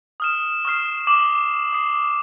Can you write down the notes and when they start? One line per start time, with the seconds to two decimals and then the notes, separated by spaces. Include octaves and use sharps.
0.20 D#6 F6 E7
0.65 C#6 D#6 F6 C7
1.07 D6 E7 F#7
1.73 D#6 C7